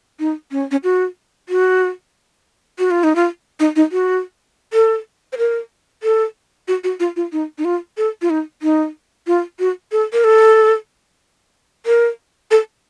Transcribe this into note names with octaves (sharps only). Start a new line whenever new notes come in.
D#4
C#4
C#4
F#4
F#4
F#4
F4
D#4
F4
D#4
D#4
F#4
A4
C5
A#4
A4
F#4
F#4
F4
F4
D#4
D#4
F4
A4
F4
D#4
D#4
F4
F#4
A4
A#4
A4
A#4
A4